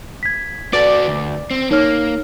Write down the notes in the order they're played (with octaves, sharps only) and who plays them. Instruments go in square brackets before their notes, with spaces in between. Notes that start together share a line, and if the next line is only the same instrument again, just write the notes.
[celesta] G#6 B6
[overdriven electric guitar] F#4 A4 [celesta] B4 [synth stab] D5
[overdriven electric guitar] D2
C4
[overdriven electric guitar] A#3 [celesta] D#4 C#5 F6